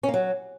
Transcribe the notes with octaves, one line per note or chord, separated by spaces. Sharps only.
C#4
A#3
F#3